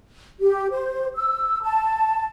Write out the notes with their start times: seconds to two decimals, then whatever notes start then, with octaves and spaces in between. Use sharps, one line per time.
0.40 G4
0.71 C5
1.16 E6
1.62 A5